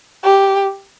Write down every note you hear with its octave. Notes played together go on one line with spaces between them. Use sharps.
G4